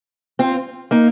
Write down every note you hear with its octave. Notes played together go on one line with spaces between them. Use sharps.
C4 F4
A#3 D#4